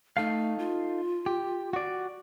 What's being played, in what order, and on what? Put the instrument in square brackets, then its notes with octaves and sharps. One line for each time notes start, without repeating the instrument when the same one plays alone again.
[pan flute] A3 [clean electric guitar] D#4 A4 F5
[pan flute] F4
[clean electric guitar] G4
F#4 D5